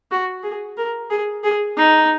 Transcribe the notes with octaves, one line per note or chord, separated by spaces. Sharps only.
F#4
G#4
A#4
G#4
G#4
D#4